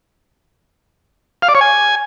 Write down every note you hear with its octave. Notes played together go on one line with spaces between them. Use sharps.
F5
D5
C#5
G#5